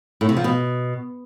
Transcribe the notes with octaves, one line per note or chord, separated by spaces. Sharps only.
A2
C3
F3
B2